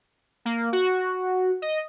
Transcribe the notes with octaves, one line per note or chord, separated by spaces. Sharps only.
A#3
F#4
D#5